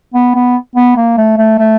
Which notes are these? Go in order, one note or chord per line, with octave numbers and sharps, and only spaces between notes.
B3
B3
B3
A#3
A3
A3
A3